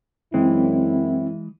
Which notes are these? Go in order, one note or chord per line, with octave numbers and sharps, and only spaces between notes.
F#2 E3 G#3 C4 E4